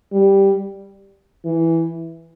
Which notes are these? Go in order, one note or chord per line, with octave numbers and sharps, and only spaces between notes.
G3
E3